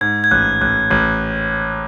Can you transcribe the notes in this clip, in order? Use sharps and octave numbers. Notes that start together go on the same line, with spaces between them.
G#2 G#6
G#6
A1 F#6
A1 F#6
A1 G#6